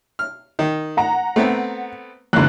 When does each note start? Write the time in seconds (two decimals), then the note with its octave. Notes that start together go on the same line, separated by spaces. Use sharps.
0.19 F6
0.59 D#3
0.97 F#5 A#5
1.36 A3 B3 C4
2.33 F#1 E2 G#2 F#6